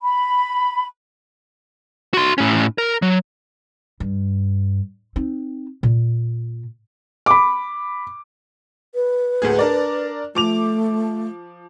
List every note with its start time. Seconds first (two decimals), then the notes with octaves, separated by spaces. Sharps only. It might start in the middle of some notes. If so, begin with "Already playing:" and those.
0.02 B5
2.14 F#4 C6
2.38 A2 C#4
2.78 A#4
3.02 F#3
4.00 G2
5.16 C4 D#4
5.83 A#2
7.26 B5 D6
8.95 B4
9.42 D2 A2 G#4
9.59 D4 A#4 D5
10.35 F3 A3 D6 F7